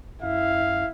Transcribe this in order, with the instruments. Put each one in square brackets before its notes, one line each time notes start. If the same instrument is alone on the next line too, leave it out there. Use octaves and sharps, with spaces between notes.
[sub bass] F#2 [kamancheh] E4 [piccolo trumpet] F5